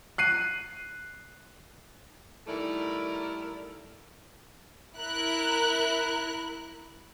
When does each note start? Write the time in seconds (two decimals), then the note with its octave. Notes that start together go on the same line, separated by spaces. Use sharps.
0.18 F#6 C7 D#7
2.47 D#3 G3 A3 E4 A#4 D5
4.98 E4 A#4 F#6